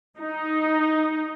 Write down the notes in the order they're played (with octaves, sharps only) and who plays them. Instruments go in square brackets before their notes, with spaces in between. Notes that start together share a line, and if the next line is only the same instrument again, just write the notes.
[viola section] D#4